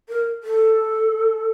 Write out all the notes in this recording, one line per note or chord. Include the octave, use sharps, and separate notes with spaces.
A#4
A4